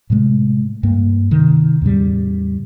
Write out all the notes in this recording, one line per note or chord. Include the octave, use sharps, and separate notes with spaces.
A2 C3 G#3 A3
G2 A#3
C3 D#3
E2 A2 C#3 G3